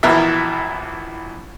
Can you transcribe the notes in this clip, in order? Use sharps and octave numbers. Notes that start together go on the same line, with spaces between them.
A#1 B2 E3 A#4 E5